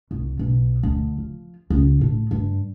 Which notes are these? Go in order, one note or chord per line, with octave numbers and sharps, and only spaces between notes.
C2
B1
D2
F3
C#2
A2
G2